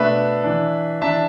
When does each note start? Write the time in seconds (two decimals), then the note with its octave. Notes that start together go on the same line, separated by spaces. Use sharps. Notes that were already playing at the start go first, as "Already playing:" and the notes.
Already playing: B2 A3 D4 B4 E5
0.44 E3 D4
1.01 E3 D4 E5 A5